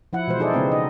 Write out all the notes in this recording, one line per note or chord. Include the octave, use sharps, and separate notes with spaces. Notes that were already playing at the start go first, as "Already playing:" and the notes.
F3 E4 F#5
B2 E3 G#3 C5
D#4 E4 G#4 A4 C5 D5
C#3 G#3 B3 C4
D#4 D#5